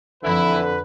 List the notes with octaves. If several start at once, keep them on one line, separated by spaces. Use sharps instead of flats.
F2 D3 E3 E4 B4